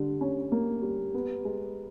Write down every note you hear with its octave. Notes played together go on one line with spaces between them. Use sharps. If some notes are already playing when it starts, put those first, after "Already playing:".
Already playing: D3 G3
C#4
A#3
G3
B3
G#3